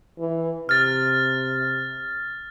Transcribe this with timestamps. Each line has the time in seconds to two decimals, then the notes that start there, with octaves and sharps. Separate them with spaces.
0.18 E3
0.69 C3 F6 A6